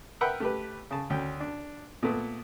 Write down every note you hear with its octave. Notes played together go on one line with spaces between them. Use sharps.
A#4 B4 E5 F#5 G5 B5
A3 G4 B4
C#3 A5
D2 C#4 G5
D4
A#2 A3 B3